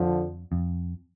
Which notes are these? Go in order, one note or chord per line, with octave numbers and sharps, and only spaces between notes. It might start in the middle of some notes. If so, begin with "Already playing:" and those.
Already playing: F2 D3 F3
F2